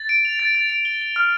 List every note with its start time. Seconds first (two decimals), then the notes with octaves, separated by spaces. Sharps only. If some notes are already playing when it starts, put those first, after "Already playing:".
Already playing: A6
0.09 D7
0.25 F7
0.39 A6
0.55 A6
0.70 D7
0.85 G7
1.01 G7
1.16 F6